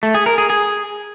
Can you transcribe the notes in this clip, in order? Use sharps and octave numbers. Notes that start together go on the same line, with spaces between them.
A3
G#4
A#4
G#4
G#4